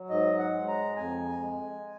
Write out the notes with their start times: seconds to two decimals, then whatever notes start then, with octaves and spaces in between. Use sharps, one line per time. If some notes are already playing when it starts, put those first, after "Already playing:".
Already playing: F#3
0.10 G#2 D#5
0.39 F#5
0.53 G#3
0.68 A#5
0.96 F2 G#5
1.40 G#3